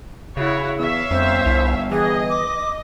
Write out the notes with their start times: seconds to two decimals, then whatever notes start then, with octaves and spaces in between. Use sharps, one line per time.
0.37 C#3 E4 F#4 C#5
0.79 E2 C#5 E5 F5
1.11 G1 F2 C5
1.46 C2
1.91 E3 G#4 D#5
2.29 D6